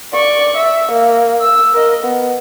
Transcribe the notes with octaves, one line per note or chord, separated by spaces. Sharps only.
D5 C#6
E5
A#3
E6
A#4 D#5
B3